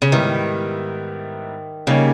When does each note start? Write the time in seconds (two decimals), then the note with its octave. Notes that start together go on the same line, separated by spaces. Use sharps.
0.02 C#3
0.11 G#2 D#3 G3 B3 E4 G4
1.87 C#3 G3 A#3 D#4 G4 C#5